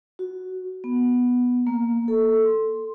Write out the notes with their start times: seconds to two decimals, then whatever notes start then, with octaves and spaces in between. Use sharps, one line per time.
0.19 F#4
0.84 B3
1.67 A#3
2.08 A4
2.45 C6